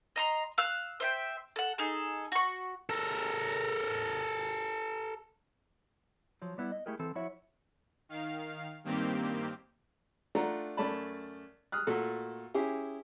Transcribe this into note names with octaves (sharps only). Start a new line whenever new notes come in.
D#5 A#5 C6
F5 E6 F#6
C5 E5 G5
A4 F#5
D#4 G#4 A4
F#4 C#6
A4 A#4
F3 F#3
G3 B3 E4
D#5
A3 E4 G4 G#4 A#4
E3 C4 A4
F3 E4 F#4 C#5 E5
D#3 F5
G2 D#3 A#3 C4 G4
A3 D4 F4 F#5 A#5
F#2 A3 D5 A5 B5
D#6 F6 F#6
A#2 A3 F#4 A4
C#4 E4 G4 G#4